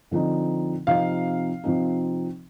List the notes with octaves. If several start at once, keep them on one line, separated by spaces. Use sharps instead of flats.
D3 F3 C4 D#4
C3 F3 C4 D#4 F5
C3 F3 C4 D#4